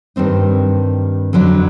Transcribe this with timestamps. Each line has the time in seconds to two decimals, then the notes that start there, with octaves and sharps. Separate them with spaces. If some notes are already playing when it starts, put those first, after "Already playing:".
0.16 G2 D#3 G3 C4 D#4
1.33 F2 D3 F#3